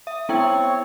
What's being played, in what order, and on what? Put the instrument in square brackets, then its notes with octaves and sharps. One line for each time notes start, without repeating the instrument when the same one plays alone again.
[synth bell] E5 [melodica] D#6
[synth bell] B3 E4 G5 [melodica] C4 C#5 C#6